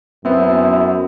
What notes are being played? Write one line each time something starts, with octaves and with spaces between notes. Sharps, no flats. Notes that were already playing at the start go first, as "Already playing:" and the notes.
F#2 B3 C4 E4